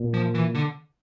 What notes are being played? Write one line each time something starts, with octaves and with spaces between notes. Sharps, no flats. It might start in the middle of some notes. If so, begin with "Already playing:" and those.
Already playing: A#2
F3
E3
D3